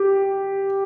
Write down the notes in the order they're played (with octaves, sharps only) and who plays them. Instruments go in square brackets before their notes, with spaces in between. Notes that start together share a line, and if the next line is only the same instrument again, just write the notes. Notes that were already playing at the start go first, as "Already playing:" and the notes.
Already playing: [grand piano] G4